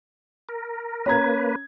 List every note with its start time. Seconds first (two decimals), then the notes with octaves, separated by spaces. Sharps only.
0.49 A#4
1.06 A#3 C#4 B4 A#5 G#6